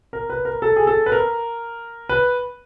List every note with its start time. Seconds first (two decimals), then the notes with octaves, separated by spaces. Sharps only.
0.13 A#4
0.30 B4
0.45 A#4
0.62 A4
0.76 G#4
0.87 A4
1.06 B4
1.12 A#4
2.09 B4